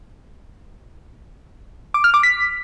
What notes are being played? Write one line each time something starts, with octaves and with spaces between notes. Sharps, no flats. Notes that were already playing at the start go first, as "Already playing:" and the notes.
D6
F6
D6
B6